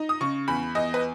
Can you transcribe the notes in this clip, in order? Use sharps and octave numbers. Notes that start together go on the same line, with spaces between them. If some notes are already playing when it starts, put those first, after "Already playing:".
Already playing: D#4
D#6
C#3 C#6
E2 B5
E2 D#5
B4